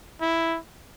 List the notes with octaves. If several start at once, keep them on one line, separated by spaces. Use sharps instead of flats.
E4